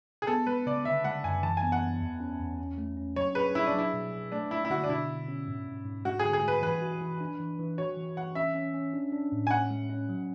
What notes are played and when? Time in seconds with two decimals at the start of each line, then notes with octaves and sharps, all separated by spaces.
0.22 G#4
0.27 B3 A4
0.47 G#3 B4
0.66 C#3 D5
0.85 D3 E5
1.04 G#3 F#5
1.24 F#2 G#5
1.43 E3 A5
1.57 G#5
1.63 B3
1.72 F#5
1.82 B3
2.01 E2
2.20 C#4
2.39 E2
2.59 C#4
2.78 A3
2.97 C#4
3.16 F#3 C#5
3.35 G#4 B4
3.54 E4 G#4
3.66 D4
3.74 F#3 E4
3.93 B2
4.13 F#3
4.32 A3 D4
4.51 A3 E4
4.65 E4
4.70 D3 F#4
4.84 D4
4.89 B2 E4
5.09 B2
5.28 C#4
5.47 G#2
5.66 G#2
5.85 G#2
6.05 G#3 F#4
6.19 D3 G#4
6.33 G#4
6.43 G#3 B4
6.62 E3 B4
6.82 F#4
7.01 E3
7.21 D4
7.39 E3
7.59 E3
7.78 F#4 C#5
7.97 E3
8.17 E3 F#5
8.35 C#4 E5
8.55 C#4
8.74 C#4
8.93 D4
9.12 D4
9.32 A2
9.47 G#5
9.51 C#4 F#5
9.71 G#3
9.89 C#4
10.09 F#3